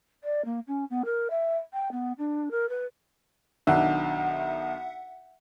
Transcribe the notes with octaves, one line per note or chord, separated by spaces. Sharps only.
D5
A#3
C#4
B3
A#4
E5
G5
B3
D4
A#4
B4
B1 D#3 D4 E5 F#5